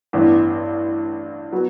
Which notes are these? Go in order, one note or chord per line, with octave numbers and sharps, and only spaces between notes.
A1 G2 E3 B3
F#3 B3 F#4